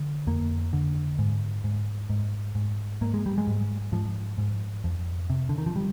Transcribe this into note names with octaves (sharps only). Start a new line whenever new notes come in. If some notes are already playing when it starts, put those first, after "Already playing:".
Already playing: D3
F2 A#3
D3
G#2
G#2
G#2
G#2
G#2 A#3
G#3
G3
G#3
G#2
G#2 F3
G#2
F2
C3
D3
D#3
F3
G3